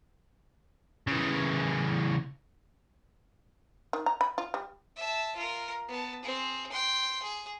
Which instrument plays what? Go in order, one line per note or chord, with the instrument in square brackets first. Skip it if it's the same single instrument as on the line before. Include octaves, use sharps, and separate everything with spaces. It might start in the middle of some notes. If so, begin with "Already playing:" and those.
[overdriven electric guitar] C#3 E3
[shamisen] D#3
A#5
B5
F4
G3
[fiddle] E5 A5
F4 A#4
B3 A5
C4 G#4
G5 C6
G#4